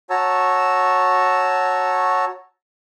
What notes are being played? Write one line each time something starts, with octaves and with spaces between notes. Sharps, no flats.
F#4 C#5 A5 A#5 E6